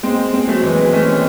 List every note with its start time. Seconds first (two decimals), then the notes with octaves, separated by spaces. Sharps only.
0.03 G#3 C4
0.33 G#3 C4
0.48 F#3 A3
0.63 E3 G#3
0.78 G#3 C4
0.93 A3 C#4
1.08 G#3 C4